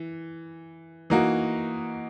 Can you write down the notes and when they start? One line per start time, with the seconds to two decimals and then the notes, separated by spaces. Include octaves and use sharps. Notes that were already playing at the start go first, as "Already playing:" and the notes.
Already playing: E3
1.10 E3 A#3 D#4 F#4